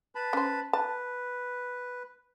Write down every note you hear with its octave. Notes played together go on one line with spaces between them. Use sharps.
B4 A5 B5
C#4 C5
B4 A5